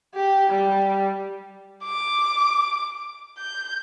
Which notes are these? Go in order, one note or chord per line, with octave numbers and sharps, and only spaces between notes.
G4
G3
D6
G6